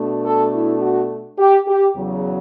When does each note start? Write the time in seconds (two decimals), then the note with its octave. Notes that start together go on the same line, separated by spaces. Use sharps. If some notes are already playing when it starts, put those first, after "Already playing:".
Already playing: B2 A3 D4
0.25 A4
0.54 E4
0.82 F#4
1.39 G4
1.67 G4
1.96 E2 C#3 F#3